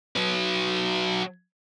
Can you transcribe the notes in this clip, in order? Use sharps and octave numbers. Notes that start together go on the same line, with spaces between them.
F#3 B4